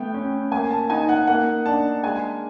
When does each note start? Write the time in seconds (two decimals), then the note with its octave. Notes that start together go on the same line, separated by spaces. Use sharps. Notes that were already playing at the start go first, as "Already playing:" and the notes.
Already playing: A3 B3 G5
0.14 C#4
0.51 A#3 G#5
0.71 A5
0.90 D#4 G#5
1.09 F#5
1.27 A#3 F#5
1.66 D4 A5
2.03 G#3 G#5